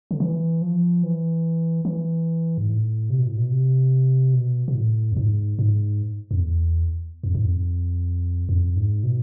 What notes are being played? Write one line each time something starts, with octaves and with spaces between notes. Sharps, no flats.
D3
E3
F3
E3
E3
G#2
A2
C3
B2
A2
B2
C3
B2
B2
A2
F2
G#2
G#2
F2
E2
F2
G#2
F2
F2
G#2
B2